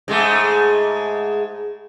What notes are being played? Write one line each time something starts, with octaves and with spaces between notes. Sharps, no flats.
G#2 G#3 A3